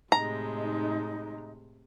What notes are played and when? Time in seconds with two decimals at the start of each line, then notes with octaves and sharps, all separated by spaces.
0.12 A2 C3 G#3 D#4 A#5